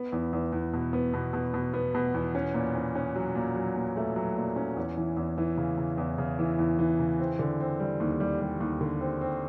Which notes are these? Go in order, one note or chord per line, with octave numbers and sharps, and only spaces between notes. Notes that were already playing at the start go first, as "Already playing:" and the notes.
Already playing: B3
E2
E2
E2
B2
B3
B2
B2
B2
B3
B2
E2
C#4
A#2
C#4
C#4
F#3
A#2
F#3
A#2
A3
F#3
A#2
C#4
E2
E3
E2
E3
C#3
C#3
E2
C#3
E3
E2
E3
C#3
C4
D3
C4
G3
D#2
G3
G3
D#2
D3
C4
C4